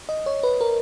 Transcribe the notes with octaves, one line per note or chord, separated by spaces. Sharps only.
D#5
C#5
B4
A#4